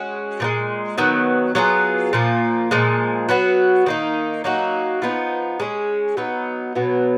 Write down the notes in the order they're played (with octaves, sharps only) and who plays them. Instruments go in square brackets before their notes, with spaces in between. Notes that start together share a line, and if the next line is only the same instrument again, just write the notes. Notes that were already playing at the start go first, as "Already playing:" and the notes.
Already playing: [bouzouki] G#3 C#4 F#4
A#2 F3 G#3
D#3 F#3 B3
F#3 B3 F4 G#4
A#2 F3 A#3
A#2 F3 G#3
F#3 B3 F#4
D#3 A#3 D#4
F#3 A#3 D#4 F#4
F3 B3 D#4
G#3 C#4 G#4
F#3 B3 D#4
B2 F#3 B3